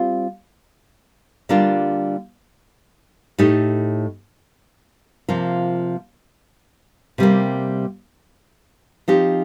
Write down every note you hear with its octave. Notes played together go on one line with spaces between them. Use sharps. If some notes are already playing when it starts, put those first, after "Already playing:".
Already playing: G3 C4 F4
D3 G3 A#3 D4 F4
A2 A3 D#4 G4
C3 F3 A#3 F4
C3 G3 A#3
F3 C4 D#4 G4